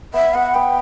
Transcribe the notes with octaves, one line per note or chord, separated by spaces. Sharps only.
B3 E5
B3 F#5
B3 G5